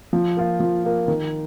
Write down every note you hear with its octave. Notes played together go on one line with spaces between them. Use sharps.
F3
A#3 F4
F3
A#3 F4
D#3